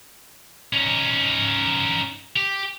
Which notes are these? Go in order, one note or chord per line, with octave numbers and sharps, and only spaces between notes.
C#4 D#4
G4